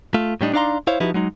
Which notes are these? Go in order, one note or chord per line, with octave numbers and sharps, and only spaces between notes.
A3 F4
A2 G3 D4 D#4
D4 D#4 D5 F5 A#5 C6
E4 C5 C#5 F5
F3 D#4 E4 F#4 G4 B4
F#3 G#3 D#4